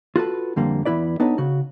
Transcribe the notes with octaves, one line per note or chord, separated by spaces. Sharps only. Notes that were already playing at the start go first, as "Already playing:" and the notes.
F4 F#4 A4 B4
F2 D3 G3 A#3
E2 D#3 E4 B4 D5
B3 D4 D#4 A4 B4 C#5
C#3 F#4